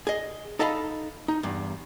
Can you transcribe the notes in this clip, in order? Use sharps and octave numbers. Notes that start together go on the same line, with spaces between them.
G#4 D#5
D#4 A4 D#5 F5 A#5 B5
D#4
E2 G2